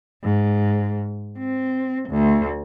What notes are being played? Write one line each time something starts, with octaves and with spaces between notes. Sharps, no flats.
G#2
C4
D2